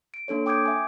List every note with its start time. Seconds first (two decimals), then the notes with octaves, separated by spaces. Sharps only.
0.14 D7
0.28 A#3 D4 A4 C#5
0.46 G5 D6 D#6 G6 G#6 D7
0.66 E5 G#5